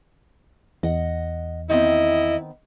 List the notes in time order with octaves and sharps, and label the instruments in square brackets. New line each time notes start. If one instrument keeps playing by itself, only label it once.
[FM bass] E2 [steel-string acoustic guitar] D#5 F#5
[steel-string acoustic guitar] D#3 B3 C4 [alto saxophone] E4 [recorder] D#5